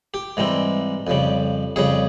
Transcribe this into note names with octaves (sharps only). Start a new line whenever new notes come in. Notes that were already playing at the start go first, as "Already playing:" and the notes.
G4
G#2 E3 G3 C4
F2 C#3 G3
F2 C#3 G3 G#4